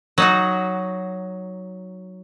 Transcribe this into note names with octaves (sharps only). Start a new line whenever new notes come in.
F#3 D#4 F#4